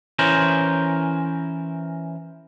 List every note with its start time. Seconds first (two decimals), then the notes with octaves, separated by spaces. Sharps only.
0.19 E3 C#4 A#4 C5